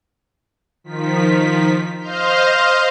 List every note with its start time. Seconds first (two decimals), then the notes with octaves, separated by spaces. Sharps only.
0.84 D#3 F3 B6
1.99 C5 D#5 F5 C6 F6 G6